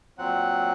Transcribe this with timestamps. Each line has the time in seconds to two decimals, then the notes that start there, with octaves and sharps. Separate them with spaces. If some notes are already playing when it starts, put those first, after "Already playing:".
0.18 A#2 F#3 C4 F#5